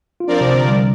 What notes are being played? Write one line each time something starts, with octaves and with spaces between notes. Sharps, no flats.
F4
F3 C4 D4 A#4 D5
C3
D3
G3